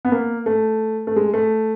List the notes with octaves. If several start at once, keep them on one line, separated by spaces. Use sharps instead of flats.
B3
A#3
A3
A3
G#3
A3